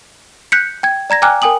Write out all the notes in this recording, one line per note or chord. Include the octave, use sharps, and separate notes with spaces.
F#6 G6 B6 C#7
G5 G#6
D5 A#5 G#6 A#6
G5 G#5 A#5 D6 F6 F#6
A#4 G5 G#5 D#6 F#7